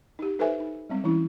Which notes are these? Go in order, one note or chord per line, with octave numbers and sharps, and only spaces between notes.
D#4 G4
D#4 A4 B4 C5 E5 G#5
D#4
G3 G#3 C4
E3 C#4 E4